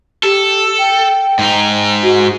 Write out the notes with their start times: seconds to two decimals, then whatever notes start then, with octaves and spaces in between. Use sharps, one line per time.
0.23 G4 A4
0.79 G5
1.39 G#2 D#4
2.03 F#4